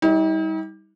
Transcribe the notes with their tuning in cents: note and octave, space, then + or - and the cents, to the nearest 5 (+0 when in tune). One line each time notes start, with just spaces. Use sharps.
G3 +0 D#4 +45